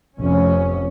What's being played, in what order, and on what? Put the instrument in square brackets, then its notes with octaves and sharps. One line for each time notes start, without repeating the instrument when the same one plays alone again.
[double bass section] F1 C#4